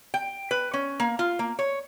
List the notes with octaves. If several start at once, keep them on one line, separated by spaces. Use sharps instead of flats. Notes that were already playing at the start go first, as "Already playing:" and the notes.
G5
B4
C#4
A#3
F4
A#3
C#5